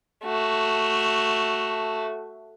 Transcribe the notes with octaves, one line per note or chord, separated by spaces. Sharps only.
A3 F#4